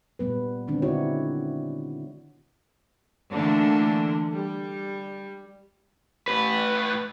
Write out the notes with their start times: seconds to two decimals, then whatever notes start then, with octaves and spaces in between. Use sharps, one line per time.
0.19 A#2 G3 B3 B4
0.68 D3 D#3 G#3 C4 D4
0.82 D3 D#4 E4 F#4 C#5
3.32 D3 E3 A3 A#3 D4
4.32 G3
6.28 A2 B4